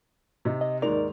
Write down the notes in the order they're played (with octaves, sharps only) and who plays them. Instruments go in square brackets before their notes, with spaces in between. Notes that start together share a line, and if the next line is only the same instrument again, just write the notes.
[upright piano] C3 D#4
[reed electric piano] D#5
[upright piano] D#2 G#2 F7 [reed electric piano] D#4 A#4 D5